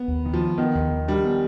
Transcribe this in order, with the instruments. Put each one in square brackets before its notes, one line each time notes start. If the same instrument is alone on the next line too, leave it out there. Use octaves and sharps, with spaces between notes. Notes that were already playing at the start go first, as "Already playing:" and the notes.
Already playing: [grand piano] B3
[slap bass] D#2
D#3
[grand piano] F3
[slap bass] B3
[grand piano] D#3 [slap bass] B3
[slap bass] D#2
D#3
[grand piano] G3 [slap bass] D4
[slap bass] B3